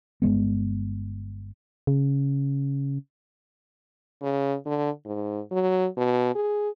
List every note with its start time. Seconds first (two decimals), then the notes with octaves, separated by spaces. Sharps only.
0.22 G1 G#2 G#3 B3
1.87 C#3
4.22 C#3
4.66 D3
5.05 G#2
5.52 F#3
5.97 B2
6.35 G#4